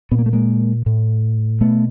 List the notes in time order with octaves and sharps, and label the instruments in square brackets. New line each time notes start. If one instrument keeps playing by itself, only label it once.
[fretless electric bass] A#2 B3
A#3
A3
G#3 A#3
A2
B2 A3 B3